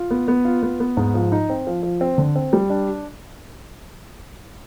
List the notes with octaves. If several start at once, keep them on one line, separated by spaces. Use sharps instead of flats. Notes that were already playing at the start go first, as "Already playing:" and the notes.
Already playing: F4
B3
B3
F4
B3
B3
G#2
F3
D#4
C4
F3
F3
C4
D3
C4
G3
D4